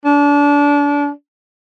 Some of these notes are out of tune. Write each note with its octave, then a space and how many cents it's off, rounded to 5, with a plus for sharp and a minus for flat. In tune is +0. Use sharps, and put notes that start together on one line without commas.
D4 -30